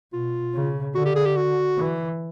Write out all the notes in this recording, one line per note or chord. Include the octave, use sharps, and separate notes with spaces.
B2 F4
C#3
D3 F#4
G4
G#4
G4
F#4
E3